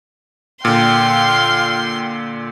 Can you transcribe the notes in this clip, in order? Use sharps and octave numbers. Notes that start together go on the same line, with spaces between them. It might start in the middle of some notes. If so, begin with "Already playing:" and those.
A#2 D3 F5 G5 C6